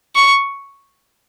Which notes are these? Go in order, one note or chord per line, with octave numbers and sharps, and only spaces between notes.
C#6